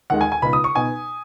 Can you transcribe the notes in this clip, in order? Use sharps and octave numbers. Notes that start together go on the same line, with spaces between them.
D#2 D#3 G#3 F#5
G#5
G#5
C#2 B2 B3 D#4 B5
D#6
C#6
B2 B3 D#4 G#5